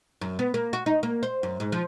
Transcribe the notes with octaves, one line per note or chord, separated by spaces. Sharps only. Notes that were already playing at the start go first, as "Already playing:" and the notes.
F#2
B3
A#3
F#4
D#4
A#3
C5
F#2
G#2
F3